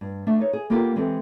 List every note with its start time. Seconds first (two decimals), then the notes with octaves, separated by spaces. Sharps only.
0.01 G2
0.27 A3 D4 E5
0.39 D#4 B4 C#5
0.53 G#4
0.70 A#3 B3 F4 G4 A4 A#4
0.96 E3 G#3 C4 G4 A4